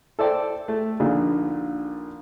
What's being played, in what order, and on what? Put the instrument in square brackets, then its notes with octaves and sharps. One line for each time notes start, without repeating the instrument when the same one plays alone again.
[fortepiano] A4 C5 D5 G5
A3
A#1 A#2 D3 D#3